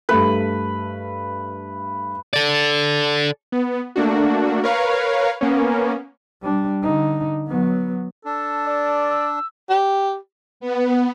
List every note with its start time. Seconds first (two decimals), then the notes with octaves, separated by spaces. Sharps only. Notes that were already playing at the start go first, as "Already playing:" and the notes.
0.09 G2 A3 A4 B4
2.33 A4 D5
3.52 B3
3.96 A3 A#3 D4 F#4
4.64 A#4 B4 C#5 F5
5.41 A#3 B3 C#4
6.42 G3 D4
6.83 D3 D#4
7.48 F#3 B3
8.25 D4 A4
8.67 D5
9.10 E6
9.69 G4
10.60 B3